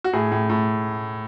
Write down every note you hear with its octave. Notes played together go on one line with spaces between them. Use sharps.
F#4
A2 G#4
A2
A2